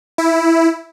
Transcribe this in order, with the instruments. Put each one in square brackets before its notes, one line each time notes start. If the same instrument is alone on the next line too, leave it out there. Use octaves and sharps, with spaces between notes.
[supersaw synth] E4